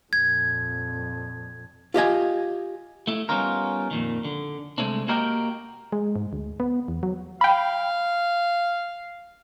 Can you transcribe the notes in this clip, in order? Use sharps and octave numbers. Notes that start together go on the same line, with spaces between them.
F2 A#2 G#6
F4 G4 D#5 G#5
A3 E4
G3 B3 C#4 D#4 F4 A#4
F2 A#2 D#3
D3
C2 G#3 A3 C4 D4
A#3 F#4 G4 A#4 D#5 G5
G#3
G#2
D2
B3
E2
F#3
F5 G5 B5